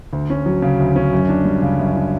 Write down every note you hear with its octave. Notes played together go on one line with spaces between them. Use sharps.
D2
C#4
F#3
C#3
D2
C#4
F#2
D4
G3
C#3
F#2
D4